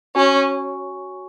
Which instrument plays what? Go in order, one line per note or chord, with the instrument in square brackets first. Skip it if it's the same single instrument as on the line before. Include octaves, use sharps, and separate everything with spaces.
[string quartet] C#4 [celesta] F#4 C#5 G#5 C#6